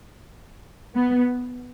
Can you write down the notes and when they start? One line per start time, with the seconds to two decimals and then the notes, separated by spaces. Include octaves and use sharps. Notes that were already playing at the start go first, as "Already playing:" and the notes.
0.95 B3